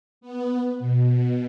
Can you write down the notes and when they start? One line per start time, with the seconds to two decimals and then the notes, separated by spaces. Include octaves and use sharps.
0.21 B3
0.79 B2